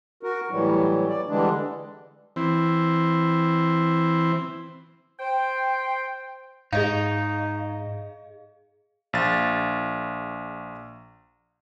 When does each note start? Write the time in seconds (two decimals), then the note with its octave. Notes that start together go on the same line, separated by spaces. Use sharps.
0.23 F#4 A#4
0.51 A2 E3 F#3 G3
1.08 D5
1.28 D3 E3 G3 G#3 D4
2.36 E3 C4
5.20 C5 G5
6.73 G#2 D#4 G#4 D#5 F5
9.13 A#1 F5 A6